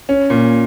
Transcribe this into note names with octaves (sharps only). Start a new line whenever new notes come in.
C#4
A#2